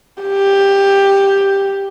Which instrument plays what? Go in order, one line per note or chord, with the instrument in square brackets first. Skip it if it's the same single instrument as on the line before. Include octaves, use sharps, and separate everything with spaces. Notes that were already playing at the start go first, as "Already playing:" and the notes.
[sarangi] G4